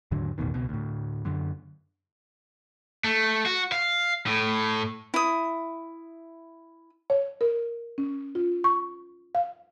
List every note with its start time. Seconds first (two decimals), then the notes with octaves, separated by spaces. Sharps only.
0.11 D#2 G#2 D3 F#3
0.38 A1 E2 B2 D#3
0.54 C#2 B2
0.69 D2 A2
1.25 F#2 D3
3.04 A3
3.46 F#4
3.72 F5
4.27 A2
5.14 E4 D#6
7.10 C#5
7.41 A#4
7.98 C#4
8.35 F4
8.64 C#6
9.35 F5